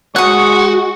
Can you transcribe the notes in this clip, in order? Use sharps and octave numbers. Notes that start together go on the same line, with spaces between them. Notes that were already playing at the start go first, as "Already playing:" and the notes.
G#3 F#4 C#6 D#6 F#6